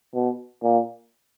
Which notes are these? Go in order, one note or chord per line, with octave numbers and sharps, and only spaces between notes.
B2
A#2